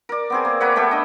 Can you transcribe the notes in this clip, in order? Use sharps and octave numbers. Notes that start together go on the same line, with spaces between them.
A#4 D5
B3 C4 G#4
A#3
A#4 B4 C#5 F#5
A3 B3 G4 A4
D4 D#5